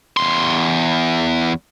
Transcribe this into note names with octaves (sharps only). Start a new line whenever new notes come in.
E2 C6